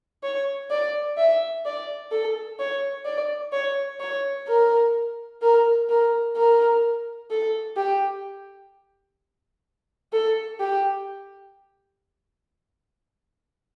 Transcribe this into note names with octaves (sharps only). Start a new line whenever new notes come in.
C#5
D5
E5
D5
A4
C#5
D5
C#5
C#5
A#4
A#4
A#4
A#4
A4
G4
A4
G4